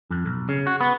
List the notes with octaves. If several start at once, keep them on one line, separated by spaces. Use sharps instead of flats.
F2
B1
C#3
F#4
B3